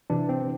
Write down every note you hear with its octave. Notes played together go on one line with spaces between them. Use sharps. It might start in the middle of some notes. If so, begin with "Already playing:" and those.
C3 E3 D4
C4